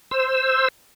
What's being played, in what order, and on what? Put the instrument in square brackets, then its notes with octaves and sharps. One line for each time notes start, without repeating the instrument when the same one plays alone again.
[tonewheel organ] C5 E6